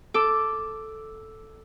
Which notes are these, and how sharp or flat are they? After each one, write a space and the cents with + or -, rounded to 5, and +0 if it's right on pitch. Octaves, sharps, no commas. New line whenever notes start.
A4 +0 D6 +0